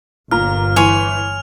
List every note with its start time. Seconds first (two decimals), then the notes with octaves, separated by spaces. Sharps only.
0.31 G1 A#2 A#5 F6
0.76 E3 C#5 G#5 C6 F6 F7